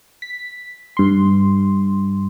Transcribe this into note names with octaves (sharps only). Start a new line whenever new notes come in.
B6
G2 C6